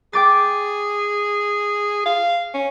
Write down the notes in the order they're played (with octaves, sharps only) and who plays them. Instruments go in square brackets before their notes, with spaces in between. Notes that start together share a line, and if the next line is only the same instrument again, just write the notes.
[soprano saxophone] G#4 [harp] G5 D6 A6
[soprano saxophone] F5
C#4